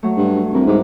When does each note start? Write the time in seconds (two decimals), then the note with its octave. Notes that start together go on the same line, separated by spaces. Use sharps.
0.03 F#3 A3
0.17 G2
0.53 C2 E3 A#4 B4
0.67 G#2 F#3 G3 D6